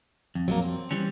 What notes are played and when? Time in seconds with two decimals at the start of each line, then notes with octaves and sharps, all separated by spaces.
0.35 F2
0.48 F#3 G#3 A#3
0.62 C4
0.91 E3 G3 C#4